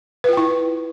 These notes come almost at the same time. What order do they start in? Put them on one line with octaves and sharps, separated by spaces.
B4 F4 G5 E4